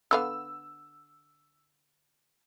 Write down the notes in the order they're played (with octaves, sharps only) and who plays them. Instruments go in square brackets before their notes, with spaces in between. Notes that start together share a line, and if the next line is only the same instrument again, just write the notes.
[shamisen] D3 B3 F5 [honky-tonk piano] E6